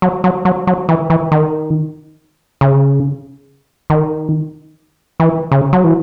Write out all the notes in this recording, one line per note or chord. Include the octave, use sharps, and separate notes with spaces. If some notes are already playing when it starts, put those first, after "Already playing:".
F#3
F#3
F#3
F#3
E3
E3
D#3
C#3
D#3
E3
C#3
F#3
E3